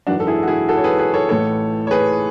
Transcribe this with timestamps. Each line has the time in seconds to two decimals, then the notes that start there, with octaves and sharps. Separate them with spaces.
0.07 G#1 F#2 E3 D4 F#4
0.20 A4
0.27 E4 G#4
0.43 F#4
0.48 E4 G#4
0.68 F#4 A4
0.77 C#5
0.84 G#4 B4
0.99 G#4 B4
1.14 A4 C#5
1.29 A1 A2 E3 A4 C#5
1.87 C#5
1.91 G#4 B4